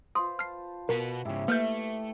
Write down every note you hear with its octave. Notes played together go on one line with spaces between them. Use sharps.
F4 B4 C5 C6 D#6
A5 F6 C7
B2 F#4 A#4 B4
G#2 C#3 E4 G4 C#5
A3 A#3 B4 E5 F6 G6